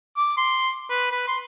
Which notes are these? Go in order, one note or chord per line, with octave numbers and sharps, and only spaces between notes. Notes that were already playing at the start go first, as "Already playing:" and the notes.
D6
C6
B4
B4
C6